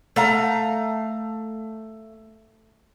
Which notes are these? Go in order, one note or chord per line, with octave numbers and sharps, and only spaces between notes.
A3 F5 A#5